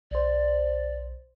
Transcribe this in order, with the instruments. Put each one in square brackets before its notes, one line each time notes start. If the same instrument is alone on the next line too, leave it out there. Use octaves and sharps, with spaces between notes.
[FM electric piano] B1 C5 [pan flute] D5